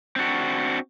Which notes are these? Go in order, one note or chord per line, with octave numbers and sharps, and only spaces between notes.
C4 D4 F#4